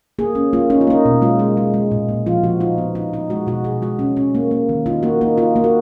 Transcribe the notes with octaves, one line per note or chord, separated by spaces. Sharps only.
A#3 G#4
C#4
A#3 F4
C#4 D#4
F4
A#3 D#4
B2
G#3 F4
G#3
G#3
G#3
A#2
A#2
F3 F4
F3 F#4
D#4 F4
B3
D#4
D#4
G#3 F#4
B2 F#4
B2 G#4
G#3 F#4
C#4
C#4
A#3
A#3
D#3
D#4 F4
A#3 F#4
A#3 D#4
D#4 F4
A#3
F#4